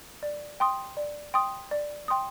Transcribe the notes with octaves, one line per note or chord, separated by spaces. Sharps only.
D5
G5 C6 D#6
D5
G5 C6 D#6
D5
G5 C6 D#6